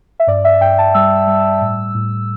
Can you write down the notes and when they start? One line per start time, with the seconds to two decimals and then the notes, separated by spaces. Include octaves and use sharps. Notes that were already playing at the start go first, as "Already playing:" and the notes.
0.20 E5
0.27 G2 D5
0.45 E5
0.61 G2 G5
0.78 A5
0.94 G3 E6
1.27 G3
1.61 A2
1.95 A2